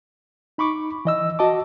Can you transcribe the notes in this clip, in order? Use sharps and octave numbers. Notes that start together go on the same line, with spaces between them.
D#4 B5 C#6 D6
E3 D#5 E6
F#4 D#5 A5 D6